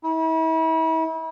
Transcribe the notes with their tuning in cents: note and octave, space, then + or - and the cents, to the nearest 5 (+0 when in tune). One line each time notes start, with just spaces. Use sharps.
E4 -40